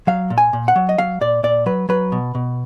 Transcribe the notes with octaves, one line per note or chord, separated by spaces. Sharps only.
F#3 F5
A#2
G#5
A#2
F#5
F#3
D#5
F#3 F5
A#2 D5
A#2 D5
F#3 B4
F#3 B4
B2
B2